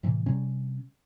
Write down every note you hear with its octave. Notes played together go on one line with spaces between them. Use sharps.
A2 C3 E3
C3 G3 C#4